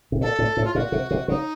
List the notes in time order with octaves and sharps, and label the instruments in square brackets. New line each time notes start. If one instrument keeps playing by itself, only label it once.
[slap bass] C3
[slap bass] A#2 [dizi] A4
[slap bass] A2
A2
[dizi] F4
[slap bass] A#2 [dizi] F#4
[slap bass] C3
C3
[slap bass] C#3 [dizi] D#4